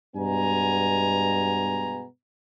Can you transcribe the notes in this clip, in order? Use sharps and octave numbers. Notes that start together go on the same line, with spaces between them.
G2 B2 G#3 B3 G#5 A#5